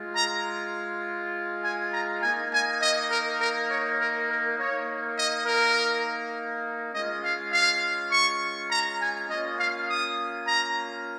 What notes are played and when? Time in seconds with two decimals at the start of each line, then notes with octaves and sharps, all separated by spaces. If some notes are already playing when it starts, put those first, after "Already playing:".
Already playing: G#3 F4
0.16 A#5
1.63 G#5
1.92 A#5
2.22 A#3 D#4 G#5
2.52 G#5
2.81 D#5
3.11 A#4
3.40 A#4
3.70 C#5
3.99 A#4
4.29 A#4
4.57 A#3 D#4 C#5
5.17 D#5
5.46 A#4
6.93 G#3 C#4 F4 D#5
7.23 F5
7.53 F5
8.11 C#6
8.70 A#5
9.00 G#5
9.29 A#3 C#4 F4 D#5
9.58 F5
9.88 D#6
10.47 A#5